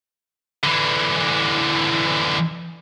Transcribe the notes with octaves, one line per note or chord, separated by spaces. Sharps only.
D3 E3